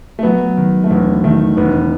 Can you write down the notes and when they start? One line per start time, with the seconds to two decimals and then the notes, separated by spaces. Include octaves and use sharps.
0.19 A3
0.23 F#3 B3
0.57 D#3
0.84 A3
0.90 E1 B3
1.24 D#3 A3
1.57 E1 B3